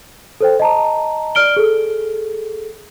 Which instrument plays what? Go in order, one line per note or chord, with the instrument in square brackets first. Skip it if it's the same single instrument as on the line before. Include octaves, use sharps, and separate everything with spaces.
[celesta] A4 C5 G5
D#5 A5 A#5
D5 F6 D7 G7
G#4 A4